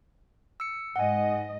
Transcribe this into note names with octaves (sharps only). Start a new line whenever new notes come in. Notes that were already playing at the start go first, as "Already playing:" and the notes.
E6 C#7
G#2 D#5 F#5 G#5